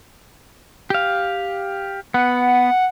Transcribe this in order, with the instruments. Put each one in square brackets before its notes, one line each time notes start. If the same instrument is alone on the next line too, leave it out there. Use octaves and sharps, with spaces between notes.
[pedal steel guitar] G4 F5
[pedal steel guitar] B3 [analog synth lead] F#5